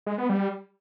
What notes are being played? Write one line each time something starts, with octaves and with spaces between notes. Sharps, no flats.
G#3
B3
G3